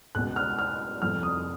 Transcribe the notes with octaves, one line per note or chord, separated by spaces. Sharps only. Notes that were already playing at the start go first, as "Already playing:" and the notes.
C#2 B2 F#6
F6
F6
F1 F2 F3 F6
D#6